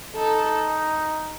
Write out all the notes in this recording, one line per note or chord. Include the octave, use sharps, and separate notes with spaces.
D#4 A4